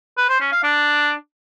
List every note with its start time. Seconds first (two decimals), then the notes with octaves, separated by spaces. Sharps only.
0.17 B4
0.29 C5
0.40 C#4
0.52 F5
0.63 D4